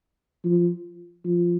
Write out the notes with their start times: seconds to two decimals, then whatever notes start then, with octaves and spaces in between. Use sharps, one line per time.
0.45 F3
1.25 F3